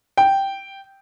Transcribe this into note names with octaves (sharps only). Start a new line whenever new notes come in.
G5